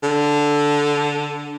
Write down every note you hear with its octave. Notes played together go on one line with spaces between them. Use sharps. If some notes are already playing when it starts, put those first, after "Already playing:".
D3